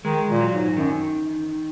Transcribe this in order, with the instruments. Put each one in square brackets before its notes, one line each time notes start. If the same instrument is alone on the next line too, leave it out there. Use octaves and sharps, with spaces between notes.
[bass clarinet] D#3 [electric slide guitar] G#3
[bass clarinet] A#2
[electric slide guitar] F#3
[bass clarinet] G#2
[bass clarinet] F#2 [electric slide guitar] D#3